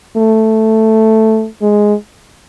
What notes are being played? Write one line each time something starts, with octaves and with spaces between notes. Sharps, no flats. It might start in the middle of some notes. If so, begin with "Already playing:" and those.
A3
G#3